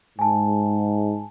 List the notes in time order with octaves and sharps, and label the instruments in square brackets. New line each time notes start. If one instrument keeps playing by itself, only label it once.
[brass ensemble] G#2 [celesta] G#5 A5